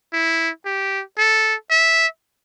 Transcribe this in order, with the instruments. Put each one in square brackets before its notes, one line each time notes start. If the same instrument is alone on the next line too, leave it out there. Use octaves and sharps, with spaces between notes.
[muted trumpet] E4
G4
A4
E5